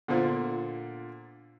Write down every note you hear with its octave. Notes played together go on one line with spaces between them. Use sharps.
A#2 D3 B3 F4 C5